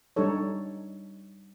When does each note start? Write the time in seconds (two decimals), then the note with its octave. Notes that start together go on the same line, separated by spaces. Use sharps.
0.16 G3 D4 D#4 A4 C#5